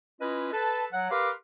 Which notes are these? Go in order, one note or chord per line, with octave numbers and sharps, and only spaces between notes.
C#4 E4 F4 B4 D#5
A4 B4 A5
F#3 F#5
G4 A#4 B4 F5 C6 D6